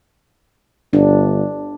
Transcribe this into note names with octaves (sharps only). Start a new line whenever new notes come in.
G1 D4